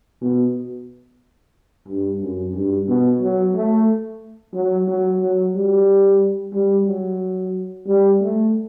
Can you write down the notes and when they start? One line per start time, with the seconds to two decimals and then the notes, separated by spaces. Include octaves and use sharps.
0.22 B2
1.88 G2
2.21 F#2
2.55 G2
2.89 B2
3.22 F#3
3.55 A3
4.54 F#3
4.88 F#3
5.21 F#3
5.55 G3
6.54 G3
6.87 F#3
7.87 G3
8.21 A3